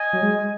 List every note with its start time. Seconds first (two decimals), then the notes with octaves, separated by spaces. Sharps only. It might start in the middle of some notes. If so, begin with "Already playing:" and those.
Already playing: D#5 G#5
0.13 F#3
0.22 G#3